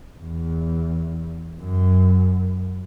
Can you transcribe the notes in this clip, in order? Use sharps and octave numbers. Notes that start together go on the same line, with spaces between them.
E2
F#2